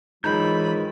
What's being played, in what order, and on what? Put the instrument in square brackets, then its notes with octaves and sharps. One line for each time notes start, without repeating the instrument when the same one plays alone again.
[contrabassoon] G#2 [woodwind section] D#3 F#3 F4 [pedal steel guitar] E3 G6 [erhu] B5